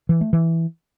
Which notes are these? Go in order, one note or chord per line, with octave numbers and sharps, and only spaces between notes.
E3
A3
E3